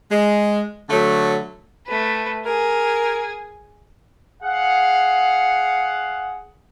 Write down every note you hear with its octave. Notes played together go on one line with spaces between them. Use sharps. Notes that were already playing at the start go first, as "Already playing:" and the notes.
G#3
D3 F#3 A3
A3 B4
G#4 A#4
G#4 F5 F#5